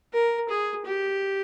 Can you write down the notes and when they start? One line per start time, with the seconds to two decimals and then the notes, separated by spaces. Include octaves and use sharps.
0.14 A#4
0.49 G#4
0.85 G4